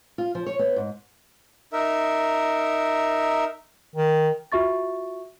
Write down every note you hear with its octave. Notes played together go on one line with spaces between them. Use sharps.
F4
F3
C#5
B3
G#2
D#4 A#4 E5
D#3
F4 F#4 E5 C#6 A6